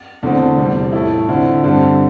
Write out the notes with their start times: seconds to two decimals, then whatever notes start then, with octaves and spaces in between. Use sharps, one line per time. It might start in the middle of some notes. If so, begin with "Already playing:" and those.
0.23 E2 D3 A3 C4
0.58 E2 C3 G3 C4
0.93 A2 A3 E4
1.29 D3 C4 E4
1.64 G2 D3 C4